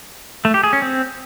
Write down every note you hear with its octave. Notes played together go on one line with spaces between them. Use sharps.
A3
G4
G#4
C#4
C4